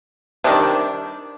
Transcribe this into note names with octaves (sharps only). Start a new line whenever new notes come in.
C3 D#3 G3 D4